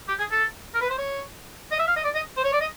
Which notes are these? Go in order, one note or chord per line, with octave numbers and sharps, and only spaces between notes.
G4
G#4
A4
A#4
B4
C5
C#5
D#5
E5
F5
D#5
D5
D#5
C5
C#5
D5
D#5